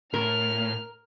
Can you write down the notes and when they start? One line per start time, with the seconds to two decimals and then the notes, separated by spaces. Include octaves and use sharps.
0.14 A2 A#4 F6